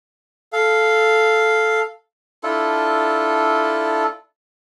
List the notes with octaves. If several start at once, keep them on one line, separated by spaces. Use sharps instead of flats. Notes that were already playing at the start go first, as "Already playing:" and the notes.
A4 F5
D4 E4 F4 A4